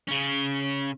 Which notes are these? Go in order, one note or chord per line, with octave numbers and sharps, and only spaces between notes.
C#3 C#4